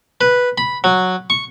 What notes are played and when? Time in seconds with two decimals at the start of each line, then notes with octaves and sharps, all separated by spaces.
0.21 B4
0.58 B5
0.84 F#3
1.30 C#6